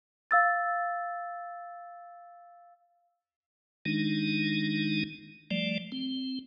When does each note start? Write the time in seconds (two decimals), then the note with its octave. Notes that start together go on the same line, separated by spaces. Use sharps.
0.31 F5 E6 A6
3.86 D#3 G#3 D4 D#4
5.51 F3 G3 A3 D5
5.92 C4